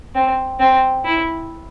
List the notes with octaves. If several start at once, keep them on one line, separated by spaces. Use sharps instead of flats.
C4
C4
E4